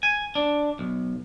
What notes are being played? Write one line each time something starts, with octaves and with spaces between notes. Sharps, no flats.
G#5
D4
B1